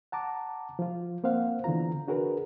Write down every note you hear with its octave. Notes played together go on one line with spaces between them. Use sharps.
F#5 A5 A#5 D6
F3 F4
A#3 C4 C5 F5 F#5
D3 E3 B3 F4 A#5
D4 F#4 G#4 A#4 B4